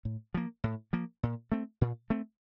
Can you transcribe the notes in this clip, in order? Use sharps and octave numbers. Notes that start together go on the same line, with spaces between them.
A2
F3 A#3
A2
F3 A#3
A#2
A3 C4
A#2
A3 C4